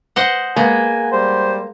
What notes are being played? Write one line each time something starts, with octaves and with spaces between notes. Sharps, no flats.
C5 D#5 F#5
G#3 A#3 B3 G#5
G3 C5